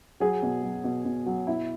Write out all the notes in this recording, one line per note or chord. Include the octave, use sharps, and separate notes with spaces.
F#3 G#4
B2
F#3
B2
B2
F#3
B2 E4